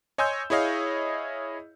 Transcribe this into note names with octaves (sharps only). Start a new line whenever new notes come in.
C#5 D#5 G#5 C6 E6 G6
E4 G#4 C#5 D#5 F5